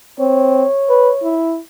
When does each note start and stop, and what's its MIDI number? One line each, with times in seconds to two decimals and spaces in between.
0.20 0.64 60
0.20 1.37 73
0.90 1.10 71
1.23 1.59 64